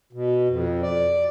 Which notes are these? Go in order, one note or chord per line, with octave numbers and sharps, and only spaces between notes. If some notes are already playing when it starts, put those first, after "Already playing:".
B2
F2
D5